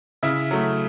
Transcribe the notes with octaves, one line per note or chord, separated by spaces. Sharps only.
C#3 E4 E5
F#3 A3